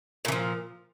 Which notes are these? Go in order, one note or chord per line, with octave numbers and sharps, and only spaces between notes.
A#2 E3 F3